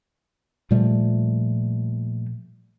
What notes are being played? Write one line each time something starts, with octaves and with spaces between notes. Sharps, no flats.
A#2 F3 G3 A3